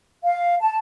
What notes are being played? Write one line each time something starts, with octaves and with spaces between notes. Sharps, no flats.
F5
A5